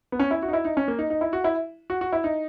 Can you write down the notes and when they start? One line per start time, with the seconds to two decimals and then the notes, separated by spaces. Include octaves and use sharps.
0.12 B3
0.20 C#4
0.31 E4
0.42 F#4
0.48 D#4
0.53 E4
0.65 D#4
0.77 C#4
0.88 A#3
0.99 D#4
1.10 D#4
1.21 E4
1.33 F#4
1.44 E4
1.90 F#4
2.01 F#4
2.13 E4
2.24 D#4